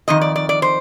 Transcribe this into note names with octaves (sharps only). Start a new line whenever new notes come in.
F2 D#3 D#5
D5
D5
D5
C5